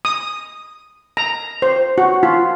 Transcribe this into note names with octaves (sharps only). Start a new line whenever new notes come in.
D#6
A#5
C5
F#4
F4